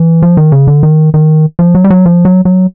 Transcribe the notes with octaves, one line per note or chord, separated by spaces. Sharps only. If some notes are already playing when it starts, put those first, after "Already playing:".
Already playing: E3
F3
D#3
C#3
D3
D#3
D#3
F3
F#3
G3
F#3
F3
F#3
F#3